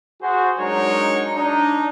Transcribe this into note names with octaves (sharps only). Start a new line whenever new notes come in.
F#4 G#4 C5
F#3 G#3 D4 D#4 A#4 C#5
D4 D#4